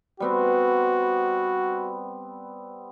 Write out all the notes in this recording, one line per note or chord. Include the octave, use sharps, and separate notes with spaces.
G3 B3 C4 F#4